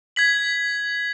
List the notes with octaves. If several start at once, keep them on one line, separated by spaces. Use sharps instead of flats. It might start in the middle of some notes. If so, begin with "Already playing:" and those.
G#6 B6 F#7